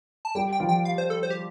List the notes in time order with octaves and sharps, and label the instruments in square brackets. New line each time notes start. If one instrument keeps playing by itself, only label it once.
[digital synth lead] A5
[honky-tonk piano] G3 G4 [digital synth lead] G5
[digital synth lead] G5
[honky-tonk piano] F3 F4
[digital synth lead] G5
F5
C5
A4
C5
G4